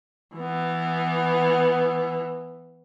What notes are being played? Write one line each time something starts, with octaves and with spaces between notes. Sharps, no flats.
E3 B3